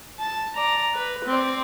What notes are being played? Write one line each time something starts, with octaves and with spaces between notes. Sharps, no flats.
A5
D5 A#5
B4
C4 D5